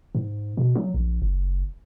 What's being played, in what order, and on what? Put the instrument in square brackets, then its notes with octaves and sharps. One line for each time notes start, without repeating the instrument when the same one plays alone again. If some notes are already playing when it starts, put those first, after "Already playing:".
[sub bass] G#2
B2
F#3
A#1
F#1